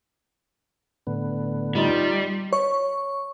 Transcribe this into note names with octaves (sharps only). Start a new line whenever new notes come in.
A2 D3 B3
G3 D#4 F4
C#5 C#6